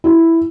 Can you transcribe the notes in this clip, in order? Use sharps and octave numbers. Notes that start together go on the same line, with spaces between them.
E4